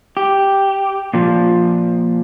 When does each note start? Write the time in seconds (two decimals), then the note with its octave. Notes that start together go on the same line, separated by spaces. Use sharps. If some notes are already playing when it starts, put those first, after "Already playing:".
0.17 G4
1.14 A#2 F3